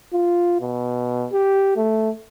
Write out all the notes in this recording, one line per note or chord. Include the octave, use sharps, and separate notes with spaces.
F4
B2
G4
A3